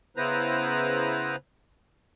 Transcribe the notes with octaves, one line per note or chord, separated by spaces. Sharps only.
C#3 B3 E4 B4 C5 A#5